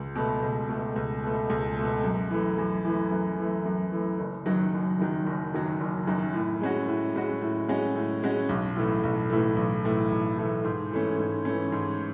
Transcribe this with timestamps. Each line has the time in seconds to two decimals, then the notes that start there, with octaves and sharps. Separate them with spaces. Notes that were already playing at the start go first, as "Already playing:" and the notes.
Already playing: C#2
0.15 B2 A3
0.42 C#2
0.69 B2 A3
0.96 C#2
1.23 B2 A3
1.50 C#2
1.77 B2 A3
2.04 F#2
2.31 E3 A3
2.58 F#2
2.85 E3 A3
3.11 F#2
3.38 E3 A3
3.65 F#2
3.92 E3 A3
4.19 F#1
4.46 F#2 D#3 F#3
4.72 F#1
4.99 F#2 D#3 F#3
5.26 F#1
5.54 F#2 D#3 F#3
5.80 F#1
6.07 F#2 D#3 F#3
6.34 A2
6.61 G#3 C#4 F#4
6.88 A2
7.15 G#3 C#4 F#4
7.42 A2
7.68 G#3 C#4 F#4
7.96 A2
8.23 G#3 C#4 F#4
8.49 B1
8.76 A2 E3 A3
9.03 B1
9.30 A2 E3 A3
9.56 B1
9.84 A2 E3 A3
10.11 B1
10.37 A2 E3 A3
10.64 G#2
10.91 E3 A3 C#4
11.19 G#2
11.45 E3 A3 C#4
11.72 G#2